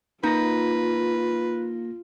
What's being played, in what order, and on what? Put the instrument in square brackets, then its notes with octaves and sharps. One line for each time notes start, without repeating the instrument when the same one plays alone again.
[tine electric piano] A#3 A#6 [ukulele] D#4 [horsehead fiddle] F4 [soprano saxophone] B4